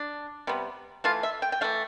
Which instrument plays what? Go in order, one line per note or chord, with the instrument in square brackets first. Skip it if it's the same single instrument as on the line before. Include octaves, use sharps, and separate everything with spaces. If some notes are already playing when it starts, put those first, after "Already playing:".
Already playing: [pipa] D4
C3 G3 B3
E3 A3 F4
E5
G5
G5
E3 A3 F5